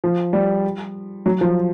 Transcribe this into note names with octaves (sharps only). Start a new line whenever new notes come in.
F3
G3
F#3
F3